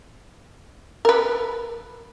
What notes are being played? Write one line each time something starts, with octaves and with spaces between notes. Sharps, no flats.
A#4 B4